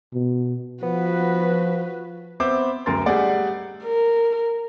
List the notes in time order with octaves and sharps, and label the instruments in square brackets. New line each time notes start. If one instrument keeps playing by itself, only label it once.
[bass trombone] B2
[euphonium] F3 [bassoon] B3 [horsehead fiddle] F#4 B4
[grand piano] B3 C4 C5 E5 D6
D1 F#2 A3 A#4 C6 A6
G3 A3 G#4 D5 F#5
[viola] A#4